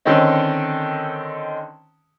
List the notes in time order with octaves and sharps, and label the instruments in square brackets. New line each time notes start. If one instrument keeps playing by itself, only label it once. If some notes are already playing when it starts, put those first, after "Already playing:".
[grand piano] D3 D#3 C4 C#4 D#4